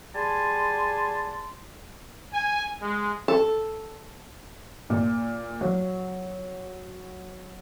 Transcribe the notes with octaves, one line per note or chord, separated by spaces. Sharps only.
G3 G#4 G#5 A5 C6
G#5
G#3
A4
A#2
F#3